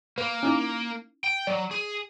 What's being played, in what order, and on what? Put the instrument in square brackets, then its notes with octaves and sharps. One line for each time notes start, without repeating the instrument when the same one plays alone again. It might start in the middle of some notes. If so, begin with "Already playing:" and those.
[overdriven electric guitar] A#3 [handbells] B4
[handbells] C#4 D#4 E4
[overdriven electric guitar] G5
[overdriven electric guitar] F#3 [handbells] D5
[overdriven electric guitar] G#4